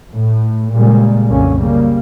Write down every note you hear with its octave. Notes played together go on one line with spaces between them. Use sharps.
A2
A#2 C#3 G3 G#3 A#3
C2 F#2 D3 A#3 C#4
C#3 G3 A#3